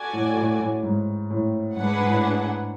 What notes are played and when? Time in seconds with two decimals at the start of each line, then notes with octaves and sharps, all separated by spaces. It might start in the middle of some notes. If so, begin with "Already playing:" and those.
Already playing: F#4 A4 D5 G#5
0.13 A2
0.37 A2
0.60 A2
0.83 G#2
1.30 A2
1.76 G#2 D4 G#4 B4 F#5
1.98 G#2
2.07 A2